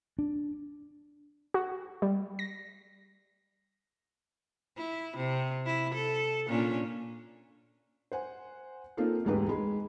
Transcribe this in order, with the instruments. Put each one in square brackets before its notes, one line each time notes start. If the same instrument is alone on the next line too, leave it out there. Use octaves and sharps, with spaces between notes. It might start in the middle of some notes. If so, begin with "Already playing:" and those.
[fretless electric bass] D4
[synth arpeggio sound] F#4
G3
A#6
[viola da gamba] E4
C3
E4
A4
A#2 C#4 D4
[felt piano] C5 F#5 G#5
A#3 C4 D#4 F4 A4
E1 D2 G#2 G#3 G4 B4
G#3 B5